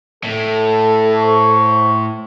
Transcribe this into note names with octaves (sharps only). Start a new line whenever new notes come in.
A2 A4
C5 C#6